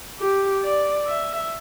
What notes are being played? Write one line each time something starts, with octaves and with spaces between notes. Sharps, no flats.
G4
D5
E5